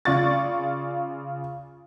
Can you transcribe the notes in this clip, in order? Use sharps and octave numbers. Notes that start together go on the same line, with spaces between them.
C#3 F4 D5 C#6 A6